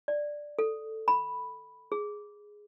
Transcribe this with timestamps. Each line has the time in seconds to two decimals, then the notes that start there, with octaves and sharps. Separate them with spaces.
0.08 D5
0.59 A4
1.08 B5
1.92 G#4